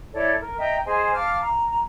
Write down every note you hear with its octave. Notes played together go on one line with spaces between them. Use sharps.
E4 A4 C#5 D5
A#4
D#5 E5 G5 A#5
G#4 C5 D#5 G#5
F5 A5 D6 F6
A#5